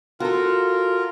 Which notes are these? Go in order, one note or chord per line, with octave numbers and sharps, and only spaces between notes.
F4 F#4 A4 A#4